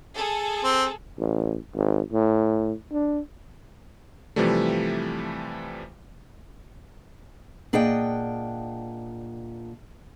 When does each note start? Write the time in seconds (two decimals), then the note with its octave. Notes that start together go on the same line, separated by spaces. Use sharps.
0.15 G#4 A4
0.64 C4
1.18 A1
1.75 G#1
2.13 A2
2.92 D4
4.36 C3 E3 F3 G3 A3
7.73 A#2 D4 G#4 D#5 F#5 G5